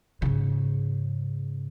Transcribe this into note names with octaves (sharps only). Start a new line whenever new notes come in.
G#2 C#3